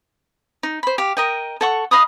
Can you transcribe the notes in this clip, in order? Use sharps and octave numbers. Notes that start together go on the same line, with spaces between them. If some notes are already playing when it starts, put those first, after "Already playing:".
D#4
C5 B5
G4 F5
A#4 D#5 G5
A4 F#5 C#6
D#5 F5 B5 D#6